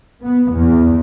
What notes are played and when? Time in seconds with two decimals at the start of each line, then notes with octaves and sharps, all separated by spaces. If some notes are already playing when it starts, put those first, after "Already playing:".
0.24 B3
0.53 E2